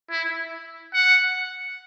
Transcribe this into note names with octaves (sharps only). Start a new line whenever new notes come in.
E4
F#5